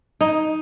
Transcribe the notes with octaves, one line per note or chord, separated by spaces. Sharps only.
D#4